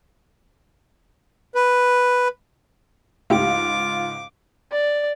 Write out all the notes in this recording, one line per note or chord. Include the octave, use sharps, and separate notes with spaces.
B4
C#2 G#2 A3 E4 F4 G4 D6
D5